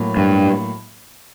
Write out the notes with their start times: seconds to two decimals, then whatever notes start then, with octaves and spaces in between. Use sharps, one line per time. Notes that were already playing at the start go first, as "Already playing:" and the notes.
Already playing: A2 F#3 A#3
0.17 G2